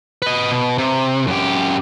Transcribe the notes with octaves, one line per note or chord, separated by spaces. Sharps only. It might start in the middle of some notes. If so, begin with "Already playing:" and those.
B4 D#5
B2
C3
F#2 G4